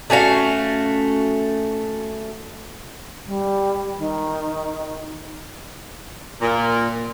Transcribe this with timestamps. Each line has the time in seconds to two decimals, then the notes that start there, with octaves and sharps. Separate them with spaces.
0.10 A3 C#4 F#4 F5
3.25 G3
3.98 D#3
6.41 A#2